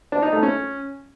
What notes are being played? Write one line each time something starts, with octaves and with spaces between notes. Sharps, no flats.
D4
D#4
A3
C#4